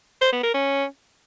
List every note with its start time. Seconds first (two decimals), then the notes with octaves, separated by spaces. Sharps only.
0.22 C5
0.32 B3
0.43 A#4
0.54 C#4